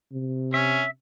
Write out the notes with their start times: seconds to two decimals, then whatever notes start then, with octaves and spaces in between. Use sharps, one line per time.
0.12 C3
0.54 C#4 E5